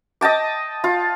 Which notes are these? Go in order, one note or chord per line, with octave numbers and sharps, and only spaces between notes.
D#5 G5 A5 D6
F4